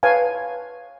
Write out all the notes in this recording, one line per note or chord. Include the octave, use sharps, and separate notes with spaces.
B4 C#5 F5 G#5 A5